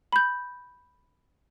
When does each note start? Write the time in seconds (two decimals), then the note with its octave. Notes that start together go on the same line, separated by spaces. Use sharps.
0.13 B5 G6